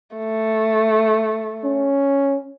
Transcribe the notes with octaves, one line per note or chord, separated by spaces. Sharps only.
A3
C#4